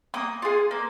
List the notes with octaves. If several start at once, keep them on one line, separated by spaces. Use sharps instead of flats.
A#3 D#6
F4 G#4
A#3